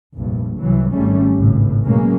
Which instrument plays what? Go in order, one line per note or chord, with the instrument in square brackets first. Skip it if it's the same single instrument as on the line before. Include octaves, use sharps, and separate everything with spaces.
[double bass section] F1 A#1 G2
C2 E3 F#3
G#1 G3 A3 C#4
G#1 C#2 A2
B2 F#3 G#3 A#3 C#4